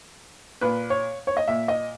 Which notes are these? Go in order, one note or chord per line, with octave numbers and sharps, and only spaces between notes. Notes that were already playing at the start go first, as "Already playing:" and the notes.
A#2 B4
C#5
C#5
D#5
A#2 E5
D#5